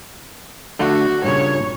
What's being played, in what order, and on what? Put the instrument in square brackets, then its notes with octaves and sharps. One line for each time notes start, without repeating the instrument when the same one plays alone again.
[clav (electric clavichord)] D3 A3 [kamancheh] F#4
[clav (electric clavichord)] G2 A#2 C#3 [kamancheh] C#5